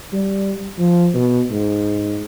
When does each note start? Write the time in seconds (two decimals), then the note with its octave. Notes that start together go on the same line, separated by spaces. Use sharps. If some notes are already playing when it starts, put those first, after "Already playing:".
0.13 G3
0.78 F3
1.14 B2
1.51 G#2